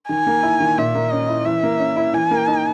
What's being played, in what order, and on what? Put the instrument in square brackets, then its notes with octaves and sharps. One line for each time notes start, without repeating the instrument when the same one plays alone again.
[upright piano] D#3 [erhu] G#5
[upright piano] A#3
E4
D#3
[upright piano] A#2 [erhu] E5
[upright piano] A#3
[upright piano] C#4 [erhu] D#5
[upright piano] E4
[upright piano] E3 [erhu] E5
[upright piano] A#3
C#4
E4
[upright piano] E3 [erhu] G#5
[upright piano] A#3
D#4